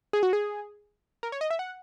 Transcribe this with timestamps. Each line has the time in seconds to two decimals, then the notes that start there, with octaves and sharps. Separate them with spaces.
0.13 G#4
0.23 F#4
0.33 G#4
1.23 A#4
1.32 C#5
1.41 D#5
1.51 E5
1.59 F#5